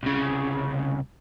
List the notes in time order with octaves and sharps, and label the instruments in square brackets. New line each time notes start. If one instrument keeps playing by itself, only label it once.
[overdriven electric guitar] C2 C#3